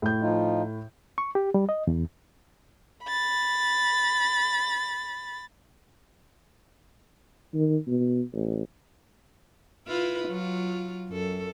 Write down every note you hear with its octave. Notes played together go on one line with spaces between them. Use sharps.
A2 G6
F3 D#4 F4
C#6
G4
G3
D#5
E2
B5 A6
D#3
B2
A1
E4 F4 B4
F#3 F4
F#2 A4